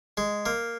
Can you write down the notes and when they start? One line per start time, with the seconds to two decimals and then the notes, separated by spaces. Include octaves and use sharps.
0.17 G#3
0.46 A#3